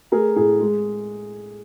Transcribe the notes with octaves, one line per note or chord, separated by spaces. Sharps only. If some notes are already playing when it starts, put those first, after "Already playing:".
A3 G#4 A#4
A2 G#4
G#3